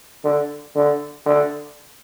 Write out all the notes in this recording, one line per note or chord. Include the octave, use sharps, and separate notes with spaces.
D3
D3
D3